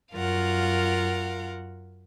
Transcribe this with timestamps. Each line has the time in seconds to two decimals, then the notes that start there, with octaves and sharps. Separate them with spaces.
0.15 F#2 F4 A#4 F5 F#5